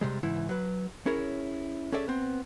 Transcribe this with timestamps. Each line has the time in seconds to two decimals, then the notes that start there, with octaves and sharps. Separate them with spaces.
0.01 C3 G3 G#3
0.23 C#2 G#2 E3 E4
0.49 F#3 B4
1.06 C#4 E4 G#4 A#4 C#5
1.92 C#4 G#4 A4 D5 E5
2.08 B3 C4